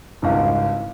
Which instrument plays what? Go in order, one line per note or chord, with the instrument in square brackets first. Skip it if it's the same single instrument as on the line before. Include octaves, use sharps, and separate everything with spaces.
[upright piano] G#1 C#2 G2 [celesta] E4 F5